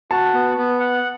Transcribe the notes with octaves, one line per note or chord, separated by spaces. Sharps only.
F#4 A5
B3
B3
F#5